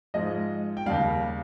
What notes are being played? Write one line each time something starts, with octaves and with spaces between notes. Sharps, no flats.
G#2 F3 G#3 D#5
G5
D#2 C#3 G3 F5